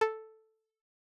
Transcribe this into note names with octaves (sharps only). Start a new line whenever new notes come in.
A4